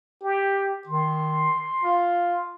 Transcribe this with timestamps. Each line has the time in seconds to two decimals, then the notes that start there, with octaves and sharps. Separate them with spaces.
0.24 G4
0.87 D#3 C6
1.84 F4